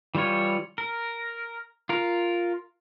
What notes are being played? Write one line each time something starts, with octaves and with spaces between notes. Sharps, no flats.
E3 G3 F4 C#5
A#4
F4 A#4